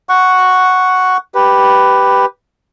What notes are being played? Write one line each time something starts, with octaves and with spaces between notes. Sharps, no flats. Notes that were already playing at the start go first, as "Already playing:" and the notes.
F#5 C#6
G4 B4